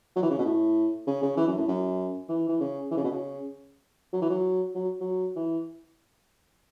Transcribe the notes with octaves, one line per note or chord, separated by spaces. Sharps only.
F#3
E3
C#3
B2
A2
C#3
C#3
E3
F#2
A2
F#2
E3
E3
C#3
E3
C#3
B2
C#3
F#3
E3
F#3
F#3
F#3
E3